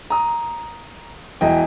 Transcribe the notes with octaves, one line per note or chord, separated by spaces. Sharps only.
A#5 D#6
E1 E3 D#5 G5